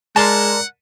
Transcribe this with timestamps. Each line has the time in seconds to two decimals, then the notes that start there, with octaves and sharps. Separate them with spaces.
0.16 G#3 A#4 D5 F#5 A5 A#5 C6